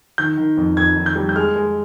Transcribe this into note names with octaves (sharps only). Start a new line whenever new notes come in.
D#3 G6
D#3
F2
F2 G#6
D#3
G6
G3
G6
G#3 F6
G#3